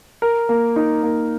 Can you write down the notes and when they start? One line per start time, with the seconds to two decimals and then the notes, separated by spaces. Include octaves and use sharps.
0.22 A#4
0.49 A#3
0.76 D#4
1.03 A#3